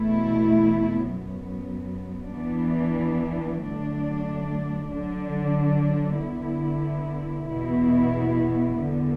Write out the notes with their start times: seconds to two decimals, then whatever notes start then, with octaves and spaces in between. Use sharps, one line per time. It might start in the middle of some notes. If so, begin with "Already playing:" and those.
Already playing: E2 B2 A3 E4
1.07 F#2 F#3 B3
2.35 E2 E3 B3 D4
3.63 D3 F#3 A3 D4
4.92 D3 F#3 D4
6.20 D3 B3 E4
7.49 E2 B2 B3 E4
8.77 E2 D3 B3